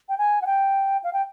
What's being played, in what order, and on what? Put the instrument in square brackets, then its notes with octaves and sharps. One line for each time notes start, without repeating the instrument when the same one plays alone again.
[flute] G5
G#5
F#5
G5
F5
G5